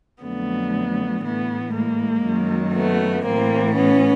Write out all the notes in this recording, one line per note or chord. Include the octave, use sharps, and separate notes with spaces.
F2 D3 F#3 A3 B3
A2 E3 A3 B3
G#3 A#3
F#2 D#3 F#3
A3 B3
A2 E3 A#3 C4
B3 C#4